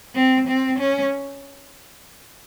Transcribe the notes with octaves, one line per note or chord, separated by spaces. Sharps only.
C4
C4
C#4